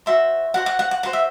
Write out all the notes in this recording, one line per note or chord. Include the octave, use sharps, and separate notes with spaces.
F#4 C5 E5
F#4 C5 F#5
F#5
F#5
F#5
F#4 C5 F#5
E5